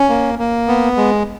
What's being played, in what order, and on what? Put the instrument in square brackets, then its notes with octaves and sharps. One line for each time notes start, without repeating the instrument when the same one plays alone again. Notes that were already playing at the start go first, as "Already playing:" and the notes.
Already playing: [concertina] C#4
A#3
A#3
B3
G#3